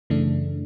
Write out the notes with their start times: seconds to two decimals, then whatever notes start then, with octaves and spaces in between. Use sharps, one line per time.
0.10 F#2 C#3 E3 A3 D4